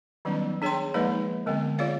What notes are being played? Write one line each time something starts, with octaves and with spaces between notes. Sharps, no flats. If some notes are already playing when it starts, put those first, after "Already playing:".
D#3 F#3 G3 B3 C#4 D#4
D4 G#4 C#5 G5 A5 C6
F3 G#3 A#3 D#4 B4 D5
D3 G#3 B3 C4
F4 G#4 C#5 D5 F5